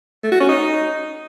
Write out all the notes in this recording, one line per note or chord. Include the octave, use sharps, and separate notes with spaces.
A3
F#4
C#4
D#4